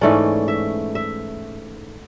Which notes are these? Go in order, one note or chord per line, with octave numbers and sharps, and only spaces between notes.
G#2 E3 A3 C#4 D5
E5
E5